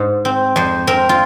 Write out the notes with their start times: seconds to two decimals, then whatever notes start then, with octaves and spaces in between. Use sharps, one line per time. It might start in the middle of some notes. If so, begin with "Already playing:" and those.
Already playing: G#2
0.25 C4
0.56 F2 C5
0.87 C4 A#4
1.09 F4